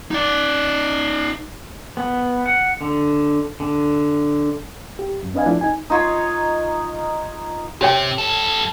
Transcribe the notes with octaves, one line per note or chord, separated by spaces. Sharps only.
D#4 D5
B3
F#5
D3
D3
G4
F#2
C4 D4 B4 D#5 F5 G#5
F3 A3 D4 E4 F4
C2 D#4 G#5
D#4 F4 C#5 C6
C3 G4 C#5 G5
G3 A4